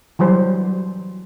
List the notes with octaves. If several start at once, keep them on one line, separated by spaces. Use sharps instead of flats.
E3 F#3 G3 C5